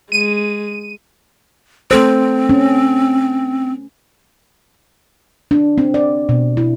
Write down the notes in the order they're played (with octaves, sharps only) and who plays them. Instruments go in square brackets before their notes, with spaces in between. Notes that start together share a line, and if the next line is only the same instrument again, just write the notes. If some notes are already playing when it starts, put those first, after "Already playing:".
[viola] G#3 [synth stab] D#7
[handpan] A3 A4 C5 [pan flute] C4
[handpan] C#4
D4
C4
D5
B2
E4